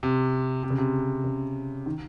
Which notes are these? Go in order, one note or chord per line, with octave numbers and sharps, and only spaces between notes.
C3
C3
C#3
C3
C#3
D#3